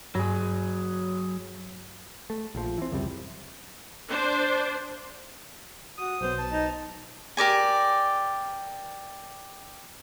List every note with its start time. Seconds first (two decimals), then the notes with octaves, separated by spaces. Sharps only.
0.15 G2 F#3 G#4
2.30 A3
2.55 A#1 F3
2.78 E3 C4
2.91 C#2 F#2 C3 G3
4.09 D4 C5
5.98 F#4 D#6
6.21 B1 F#3 B3 C5
6.39 A5
6.51 D#4
7.37 G4 A#4 D5 G#5